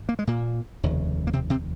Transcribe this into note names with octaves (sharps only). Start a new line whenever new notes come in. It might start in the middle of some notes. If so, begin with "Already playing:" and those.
Already playing: G#1
A#3
G#3
A#2 A#3
F1 D#2 C#3
A#3
C3 C4
C3 C4